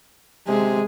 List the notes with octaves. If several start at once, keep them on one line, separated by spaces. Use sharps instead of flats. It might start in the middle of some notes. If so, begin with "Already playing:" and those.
C3 G#3 G#4